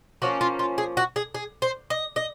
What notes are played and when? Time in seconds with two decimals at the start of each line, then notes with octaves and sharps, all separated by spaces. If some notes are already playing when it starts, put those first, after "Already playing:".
0.22 F3 A#3 C#4 F#4
0.41 F4
0.59 F4
0.78 G#4
0.97 F#4
1.16 G#4
1.34 G#4
1.62 C5
1.90 D#5
2.16 D#5